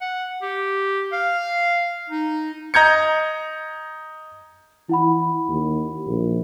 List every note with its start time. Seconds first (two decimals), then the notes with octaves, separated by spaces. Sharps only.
0.01 F#5
0.42 G4
1.12 F5
2.09 D#4
2.74 D#5 A#5 G6 G#6 C#7
4.89 E3 E4 F#5 B5
5.49 D#2
6.07 A#1